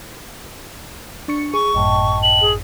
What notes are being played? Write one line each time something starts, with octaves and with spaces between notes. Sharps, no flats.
D4 C#6 C#7
G#4 C#6
G#1 F#2 A2 D#5 G5 A5
F#7
G#4